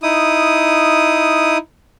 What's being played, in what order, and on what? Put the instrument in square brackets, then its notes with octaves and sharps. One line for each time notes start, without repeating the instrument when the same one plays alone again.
[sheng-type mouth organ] D#4 E4 D#6